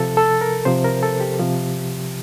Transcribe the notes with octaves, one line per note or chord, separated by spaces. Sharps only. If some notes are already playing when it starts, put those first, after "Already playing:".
Already playing: C3 F3 A4
A4
A#4
C3 F3 C5
A#4
A4
G4
C3 F3